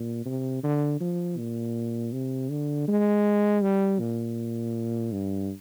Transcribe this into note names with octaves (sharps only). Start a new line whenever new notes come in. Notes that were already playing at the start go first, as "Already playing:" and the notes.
Already playing: A#2
C3
D3
F3
A#2
C3
D3
G#3
G3
A#2
G2